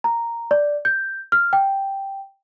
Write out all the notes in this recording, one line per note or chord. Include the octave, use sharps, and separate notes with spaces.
A#5
D5
G6
F6
G5